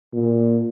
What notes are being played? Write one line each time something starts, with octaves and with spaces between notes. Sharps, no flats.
A#2